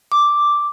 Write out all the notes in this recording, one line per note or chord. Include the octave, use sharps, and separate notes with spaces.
D6